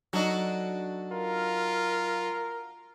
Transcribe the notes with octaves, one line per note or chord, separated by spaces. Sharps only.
F#3 D4 D#4 F#4 A4
F4 A#4